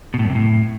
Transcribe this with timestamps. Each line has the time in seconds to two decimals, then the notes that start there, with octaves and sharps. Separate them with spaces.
0.14 B2
0.19 A2
0.25 F#2
0.30 C3
0.35 A2